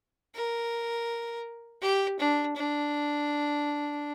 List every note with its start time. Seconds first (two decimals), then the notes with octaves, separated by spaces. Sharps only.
0.35 A#4
1.81 G4
2.19 D4
2.56 D4